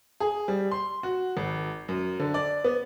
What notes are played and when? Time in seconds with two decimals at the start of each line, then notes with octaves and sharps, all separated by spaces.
0.20 G#4
0.48 G3
0.71 C6
1.03 F#4
1.37 G#1
1.88 F#2
2.20 D3
2.34 D5
2.64 B3